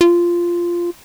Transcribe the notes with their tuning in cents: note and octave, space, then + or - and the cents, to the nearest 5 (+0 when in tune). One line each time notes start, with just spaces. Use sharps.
F4 -10